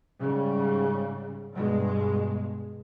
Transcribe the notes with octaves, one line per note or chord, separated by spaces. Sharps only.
G#2 C#3 G3
G2 B2 G#3